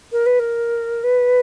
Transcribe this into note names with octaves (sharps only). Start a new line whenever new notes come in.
A#4
B4
A#4
B4